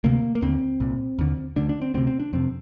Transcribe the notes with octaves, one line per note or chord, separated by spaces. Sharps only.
D2 C3 A#3
A#3
D#2 D3 C4
C2 A#2
D#2 D3
D2 D3 D4
D4
C4
D2 C3 C4
C4
D4
F2 C3 C4